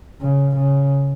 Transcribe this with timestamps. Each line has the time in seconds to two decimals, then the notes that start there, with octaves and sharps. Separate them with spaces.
0.22 C#3
0.57 C#3